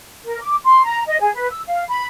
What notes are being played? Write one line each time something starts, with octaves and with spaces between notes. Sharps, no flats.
A#4
D6
C6
A#5
D#5
G#4
B4
E6
F5
B5